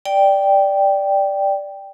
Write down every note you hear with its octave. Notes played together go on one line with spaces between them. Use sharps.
D5 G5